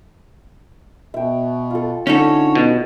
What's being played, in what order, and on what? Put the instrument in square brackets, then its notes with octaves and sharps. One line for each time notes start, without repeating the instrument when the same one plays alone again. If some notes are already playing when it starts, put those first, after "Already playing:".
[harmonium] B2 [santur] E5 G5
[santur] F4 A4
[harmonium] D3 C#5 [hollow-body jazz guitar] C#4 D#4 A4 [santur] D6
[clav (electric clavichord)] B2